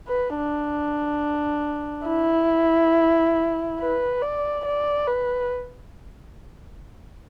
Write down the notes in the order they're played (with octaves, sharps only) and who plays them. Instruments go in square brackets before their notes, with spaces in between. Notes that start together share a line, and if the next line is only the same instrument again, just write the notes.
[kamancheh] B4
D4
E4
B4
D5
D5
B4